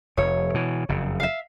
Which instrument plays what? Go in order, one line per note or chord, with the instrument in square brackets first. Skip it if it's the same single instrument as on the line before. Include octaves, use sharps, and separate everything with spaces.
[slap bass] F1 F2 [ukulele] C#5
[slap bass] B2 E3
F#1 F2 C#3
[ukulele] E5 F5